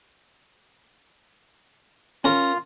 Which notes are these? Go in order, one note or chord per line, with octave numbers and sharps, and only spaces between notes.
C#4 F4 A#4